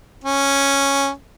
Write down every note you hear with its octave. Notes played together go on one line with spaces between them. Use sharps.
C#4